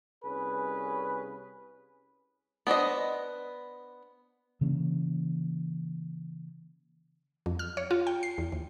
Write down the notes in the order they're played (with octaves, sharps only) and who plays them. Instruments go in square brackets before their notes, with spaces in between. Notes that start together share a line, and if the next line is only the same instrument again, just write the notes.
[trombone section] C2 C#4 G#4 B4
[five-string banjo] B3 D4 C5 D#5
[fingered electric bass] C#3 E3 A#3 C#4
[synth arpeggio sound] F2
F6
C#5
F4
G5
C7
E2
D#2